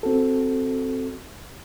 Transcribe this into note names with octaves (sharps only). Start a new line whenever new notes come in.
C4 F#4 A4